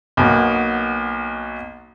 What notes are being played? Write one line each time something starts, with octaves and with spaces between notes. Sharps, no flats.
B1 B2 A#3